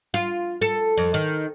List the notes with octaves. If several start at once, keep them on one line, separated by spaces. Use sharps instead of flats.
F4
A4
F2
D#3